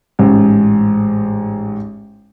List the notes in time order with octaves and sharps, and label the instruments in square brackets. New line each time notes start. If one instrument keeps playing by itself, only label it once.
[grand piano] A1 G#2